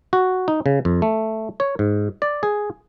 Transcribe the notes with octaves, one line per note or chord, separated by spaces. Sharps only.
F#4
D#4
C#3
F2
A3
C#5
G#2
D5
G#4